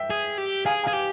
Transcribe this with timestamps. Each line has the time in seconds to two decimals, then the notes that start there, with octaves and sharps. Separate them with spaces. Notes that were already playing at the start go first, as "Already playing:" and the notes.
Already playing: E5 G5
0.10 G#4
0.38 G4
0.65 G#4 F5 G#5
0.83 F5 G#5
0.87 G#4
0.93 G4